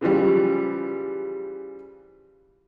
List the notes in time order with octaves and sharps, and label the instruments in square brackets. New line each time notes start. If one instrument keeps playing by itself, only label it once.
[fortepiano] C#3 E3 F3 G3